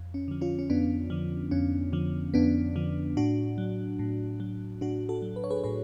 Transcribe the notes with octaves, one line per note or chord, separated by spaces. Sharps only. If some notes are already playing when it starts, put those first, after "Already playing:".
Already playing: F2
C#4
D3 F3
C#4 F4
C#4
F2 B3 D4
D3 F3
F2 C#4
D3 F3
F2 B3 D4
D3 F3
A2 D4 F#4
F#3
A2
F#3
A2 D4 F#4
F#4 A4
F#3
B4
C#5
G#4 B4
A2 G#4 B4